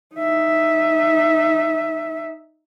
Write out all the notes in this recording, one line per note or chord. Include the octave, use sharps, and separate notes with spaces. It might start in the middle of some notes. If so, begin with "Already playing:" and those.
D#4 E5